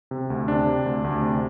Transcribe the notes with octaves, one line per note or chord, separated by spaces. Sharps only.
C3
D2
C3 D4
C3
D2
D2
C3